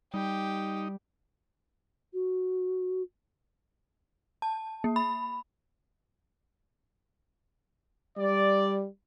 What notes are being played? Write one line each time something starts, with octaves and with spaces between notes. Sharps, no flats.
G3 D#4 G4
F#4
A5
A#3
B5
G3 D5